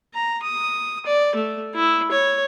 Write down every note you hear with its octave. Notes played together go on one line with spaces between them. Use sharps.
A#5
D#6
D5
A3
E4
C#5